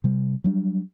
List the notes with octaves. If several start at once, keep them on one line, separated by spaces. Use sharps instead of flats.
C3 G3
F#3 G3 D4